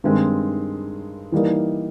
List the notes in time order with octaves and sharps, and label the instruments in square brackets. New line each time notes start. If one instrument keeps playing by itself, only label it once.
[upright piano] G2 D#3 G#3 C4
E3 G3 A#3 D#4